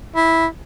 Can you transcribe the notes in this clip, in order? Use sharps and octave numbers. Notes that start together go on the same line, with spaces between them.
E4